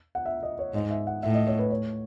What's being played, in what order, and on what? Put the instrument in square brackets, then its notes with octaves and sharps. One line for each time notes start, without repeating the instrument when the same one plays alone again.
[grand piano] F#5
E5
D#5
C#5
[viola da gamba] G#2 [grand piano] D#5
[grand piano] E5
F#5
[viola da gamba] A2 [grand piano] E5
[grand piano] D#5
C#5
B4
C#5